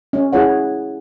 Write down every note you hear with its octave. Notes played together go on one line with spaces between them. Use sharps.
C#4
E4 G#4 C#5 F#5